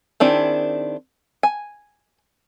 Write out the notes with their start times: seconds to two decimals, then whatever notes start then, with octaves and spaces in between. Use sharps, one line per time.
0.20 D#3 C4 D4 E4 G#4
1.43 G#5